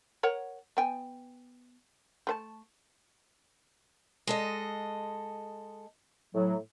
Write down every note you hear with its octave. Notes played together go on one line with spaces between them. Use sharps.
A#4 C#5 F#5
B3 G5 G#5
A3 C5 A5
G#3 A4 D#5
A2 F#3